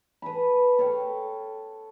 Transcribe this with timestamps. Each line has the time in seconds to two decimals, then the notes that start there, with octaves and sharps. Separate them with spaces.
0.22 B4 G#5 A5 B5
0.79 A4 C#5 F5 G5